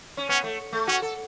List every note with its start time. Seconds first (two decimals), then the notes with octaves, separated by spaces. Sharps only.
0.17 C#4
0.29 B3 C#4
0.44 A3
0.73 A3
0.88 C#4 F#4
1.02 A4